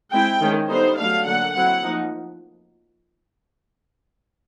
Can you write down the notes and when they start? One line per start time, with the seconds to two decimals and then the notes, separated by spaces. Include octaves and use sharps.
0.13 G#3 C4 E4 G5
0.42 D#3 G#3 C#4
0.70 D3 G3 B3 D#4 C5
0.98 F#3 A3 D4 F5
1.26 D3 F#3 A#3 F#5
1.55 F#3 A3 C4 E4 F#5
1.83 F3 A#3 D#4